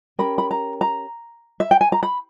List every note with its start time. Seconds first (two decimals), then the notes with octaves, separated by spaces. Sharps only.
0.19 C#4 G4 A#4 B5
0.38 B5
0.51 A#5
0.81 A#5
1.60 E5
1.71 G5
1.81 G#5
1.92 A#5
2.03 B5